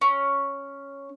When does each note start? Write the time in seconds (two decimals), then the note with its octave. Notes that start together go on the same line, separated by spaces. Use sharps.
0.01 C#4